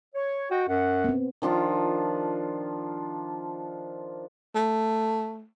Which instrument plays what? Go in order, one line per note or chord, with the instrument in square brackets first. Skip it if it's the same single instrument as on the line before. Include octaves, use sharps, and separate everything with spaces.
[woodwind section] C#5
[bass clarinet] F#4 [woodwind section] D#5 G5
[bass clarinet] F#2 [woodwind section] F#5
[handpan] B3 C4
[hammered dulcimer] D#3 F3 D4 F4
[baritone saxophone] A3